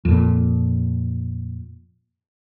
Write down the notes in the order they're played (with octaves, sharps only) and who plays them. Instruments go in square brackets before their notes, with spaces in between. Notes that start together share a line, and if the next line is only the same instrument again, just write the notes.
[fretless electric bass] F2 A#2